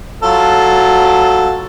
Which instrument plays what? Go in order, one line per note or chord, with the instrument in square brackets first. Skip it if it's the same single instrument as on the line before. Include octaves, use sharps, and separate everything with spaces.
[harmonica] F#3 F4 A4